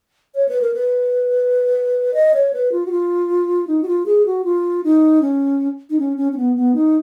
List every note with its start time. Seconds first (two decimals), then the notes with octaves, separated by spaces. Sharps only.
0.35 C#5
0.48 B4
0.61 A#4
0.74 B4
2.14 D#5
2.34 C#5
2.53 B4
2.72 F4
2.86 F#4
2.91 F4
3.67 D#4
3.83 F#4
3.87 F4
4.06 G#4
4.26 F#4
4.44 F4
4.84 D#4
5.21 C#4
5.90 D#4
5.99 C#4
6.17 C#4
6.32 C#4
6.37 B3
6.56 B3
6.75 D#4